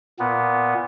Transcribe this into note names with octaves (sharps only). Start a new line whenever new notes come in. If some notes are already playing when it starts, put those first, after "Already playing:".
A#2 B3